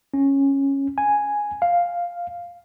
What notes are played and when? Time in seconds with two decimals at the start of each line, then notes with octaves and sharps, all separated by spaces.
0.14 C#4
0.98 G#5
1.62 F5